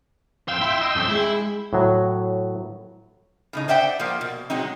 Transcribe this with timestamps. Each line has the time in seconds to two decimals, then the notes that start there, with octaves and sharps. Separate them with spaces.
0.48 F2 F5 G5 C6 E6
0.61 E4
0.81 D#5
0.96 F2 C#4
1.08 G#3 E4
1.73 A2 F#3
3.53 A2 C#3 D#4
3.68 C5 D5 E5 F#5 G5
4.00 F3 A#3
4.21 B2
4.50 F#3 G#3 C4 D#4